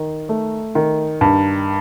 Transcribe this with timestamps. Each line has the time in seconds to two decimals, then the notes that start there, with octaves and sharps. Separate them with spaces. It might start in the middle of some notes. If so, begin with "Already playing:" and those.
Already playing: D#3
0.29 A3
0.75 D#3
1.21 G2